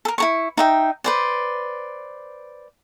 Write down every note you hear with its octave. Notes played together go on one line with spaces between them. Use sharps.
A4 A#4
E4 A#4 C#6
D#4 E5 G5
B4 C5 D5